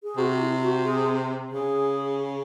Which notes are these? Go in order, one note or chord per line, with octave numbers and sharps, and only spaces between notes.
G#4
C3 F#4
E4
F#4
G#4
C#3 G#4